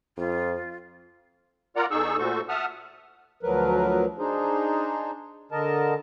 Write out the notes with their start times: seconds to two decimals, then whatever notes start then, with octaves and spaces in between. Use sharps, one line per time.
0.17 F2 F4
1.76 F4 A#4 D5 F#5 A#5
1.91 E2 D#4 G#4 A4 C#6 E6
2.18 A#2 A3 F#4 A4 C5 C#6
2.49 E5 F#5 A5 D#6 F6
3.43 D2 F3 F#3 A#4 B4
4.18 D4 D#4 G#4 C5
5.52 D3 A#4 D#5 A5